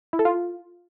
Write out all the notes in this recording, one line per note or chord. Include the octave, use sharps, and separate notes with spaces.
E4
A4
F4